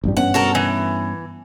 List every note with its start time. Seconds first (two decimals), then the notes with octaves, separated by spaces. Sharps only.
0.04 A1 G2 G3
0.17 G2 B3 C#4 F#5
0.34 F#4 A4 A#4
0.55 E3